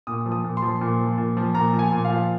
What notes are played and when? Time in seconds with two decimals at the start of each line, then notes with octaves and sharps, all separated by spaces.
0.07 A#2 D#6
0.26 F3
0.32 D#6
0.44 A#2
0.57 C6
0.62 F3
0.81 A#2
1.00 F3
1.18 A#2
1.37 F3
1.54 A#2 A#5
1.73 F3
1.79 G#5
1.92 A#2
2.05 F5
2.10 F3